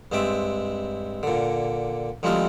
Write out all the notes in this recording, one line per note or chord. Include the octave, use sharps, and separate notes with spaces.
G2 G#3 C4 E5 D6
A#2 D3
D2 F3 G3 G#3 C4 F5